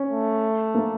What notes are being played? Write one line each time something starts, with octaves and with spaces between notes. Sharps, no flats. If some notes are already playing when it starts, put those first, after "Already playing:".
Already playing: C#4
A3
A#3